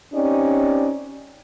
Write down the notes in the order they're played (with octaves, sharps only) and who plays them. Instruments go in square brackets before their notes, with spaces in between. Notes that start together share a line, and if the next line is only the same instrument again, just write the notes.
[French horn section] C4 C#4 D#4 G4 D5